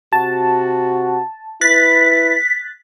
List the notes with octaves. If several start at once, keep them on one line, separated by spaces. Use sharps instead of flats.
C3 F#4 A5
E4 B4 F#6 A6 B6